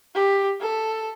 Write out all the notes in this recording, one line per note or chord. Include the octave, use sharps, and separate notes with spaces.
G4
A4